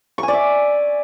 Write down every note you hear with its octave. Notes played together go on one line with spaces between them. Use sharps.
C#6
G#5
D5
E5